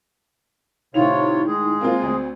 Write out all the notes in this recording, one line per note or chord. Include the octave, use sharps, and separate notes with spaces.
A2 C3 D#3 F4 C#5 F7
G#3 G#4
A#3 C4 F4
D2 C4